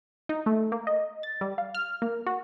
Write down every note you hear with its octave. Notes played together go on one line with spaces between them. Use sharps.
D#4
A3
A#3
D#5
A6
G3
F5
F6
A#3
F#4